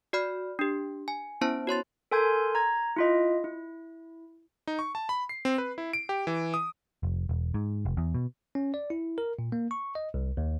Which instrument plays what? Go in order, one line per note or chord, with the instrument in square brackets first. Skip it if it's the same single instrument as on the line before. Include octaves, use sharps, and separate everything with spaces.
[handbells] F#4 D5 B5 F6
D4 G4
G#5
B3 C#4 E4 C5 A5
F#4 C#5 C6 A6
A4 A#4 G#5 C6 G6 G#6
A#5 G#6
E4 F4 D#5
E4
[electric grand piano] D#4
C#6
A5
B5
C7
C4
B4
E4
D7
G4
E3
D#6
[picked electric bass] F1
E1
G#2
F1
E2
B2
[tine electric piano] C#4
D5
E4
A#4
A#2
A#3
C#6
D#5
C2
D#2